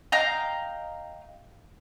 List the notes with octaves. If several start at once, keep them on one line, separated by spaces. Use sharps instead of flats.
D#5 F5 G5 A#5